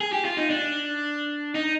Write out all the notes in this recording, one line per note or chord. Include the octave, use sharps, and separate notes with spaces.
G#4
G4
F4
D#4
D4
D#4